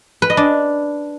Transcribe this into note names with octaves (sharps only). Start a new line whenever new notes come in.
B4
D#5
D4